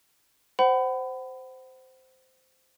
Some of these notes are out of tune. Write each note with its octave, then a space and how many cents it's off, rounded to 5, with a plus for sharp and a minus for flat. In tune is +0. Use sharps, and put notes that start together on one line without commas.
C5 -10 F#5 +30 B5 +25